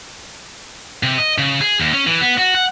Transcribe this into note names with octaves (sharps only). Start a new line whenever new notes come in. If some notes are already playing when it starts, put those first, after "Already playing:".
C3
D#5
C#3
G#4
D#2
C#4
E3
B3
F#4
F#5